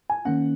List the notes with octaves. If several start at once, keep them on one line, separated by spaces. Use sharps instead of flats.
G#5
D#3 A#3 C#4 F#5